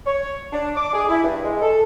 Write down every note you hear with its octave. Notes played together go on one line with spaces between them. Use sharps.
C#5
D4
D6
G#4
E4
G2
G#3
A4